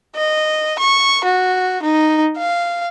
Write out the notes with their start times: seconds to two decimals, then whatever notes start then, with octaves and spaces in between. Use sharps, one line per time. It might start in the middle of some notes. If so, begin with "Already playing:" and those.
0.16 D#5
0.79 C#6
1.24 F#4
1.82 D#4
2.38 F5